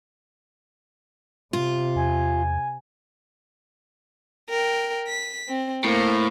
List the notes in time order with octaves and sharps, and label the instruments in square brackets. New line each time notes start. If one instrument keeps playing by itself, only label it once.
[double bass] C3 [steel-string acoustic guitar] F4
[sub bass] E2 [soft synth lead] G#5
[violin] A#4 G5
B6
C4
[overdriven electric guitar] A2 [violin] A#3 C5